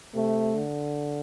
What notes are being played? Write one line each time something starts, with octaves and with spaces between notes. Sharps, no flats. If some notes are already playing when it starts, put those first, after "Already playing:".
C3 A3
D3